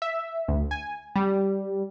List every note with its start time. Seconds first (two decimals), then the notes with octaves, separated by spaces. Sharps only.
0.02 E5
0.48 D2
0.71 G#5
1.16 G3